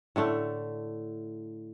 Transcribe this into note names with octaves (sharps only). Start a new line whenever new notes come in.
A2 D3 A3